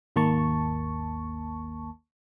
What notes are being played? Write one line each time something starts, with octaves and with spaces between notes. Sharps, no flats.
G#1 D#2 A#3 A5 C#6